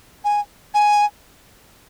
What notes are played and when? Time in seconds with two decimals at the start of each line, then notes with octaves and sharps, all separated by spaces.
0.25 G#5
0.74 G#5